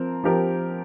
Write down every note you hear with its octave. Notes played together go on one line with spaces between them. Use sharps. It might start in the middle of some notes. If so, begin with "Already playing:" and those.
Already playing: F3 C4 A#4
F3 C4 G4 A#4